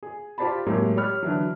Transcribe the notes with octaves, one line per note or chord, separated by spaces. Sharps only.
G#4
F4 G4 C5 D5 A5 B5
A2 C3 F#3 G#3 A#3 G4
G4 C#5 B5 F6
D3 E3 F#3